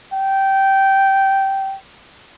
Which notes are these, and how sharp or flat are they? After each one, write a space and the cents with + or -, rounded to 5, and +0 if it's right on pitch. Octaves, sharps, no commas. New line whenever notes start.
G5 -15